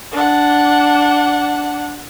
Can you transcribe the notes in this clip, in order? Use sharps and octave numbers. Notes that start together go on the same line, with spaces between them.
D4 F#5